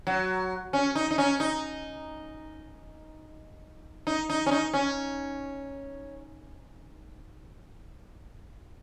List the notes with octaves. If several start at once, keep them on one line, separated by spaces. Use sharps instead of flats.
F#3
C#4
D#4
D#4
C#4
D#4
D#4
D#4
C#4
D#4
C#4